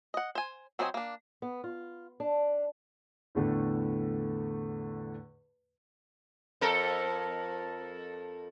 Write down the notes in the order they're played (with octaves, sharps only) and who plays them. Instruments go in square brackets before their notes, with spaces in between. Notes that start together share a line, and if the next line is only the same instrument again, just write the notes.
[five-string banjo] D#5 F#5
C5 G#5
F#3 C4 C5 D#5 G#5
A#3 D4
[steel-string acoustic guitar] B3
F4
D4
[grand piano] E2 A2 D3 A3
[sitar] F2 A4 A#4